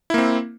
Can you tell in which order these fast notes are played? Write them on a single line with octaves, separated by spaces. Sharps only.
E4 A#3 C4